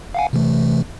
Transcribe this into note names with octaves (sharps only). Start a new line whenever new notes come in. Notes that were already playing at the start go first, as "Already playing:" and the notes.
F5 F#5 G#5
C3 E3 A3